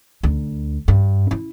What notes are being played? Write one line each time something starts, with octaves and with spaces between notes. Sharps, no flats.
D2
G2
E4